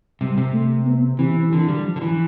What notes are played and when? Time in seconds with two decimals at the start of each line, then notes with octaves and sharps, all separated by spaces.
0.21 C3 G3
0.38 C3
0.54 A3
0.86 B3
1.19 C3 E3
1.52 D3 E3
1.69 G3
1.85 F3
1.96 D3
2.02 E3